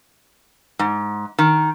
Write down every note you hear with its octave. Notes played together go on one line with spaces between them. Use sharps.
G#2
D#3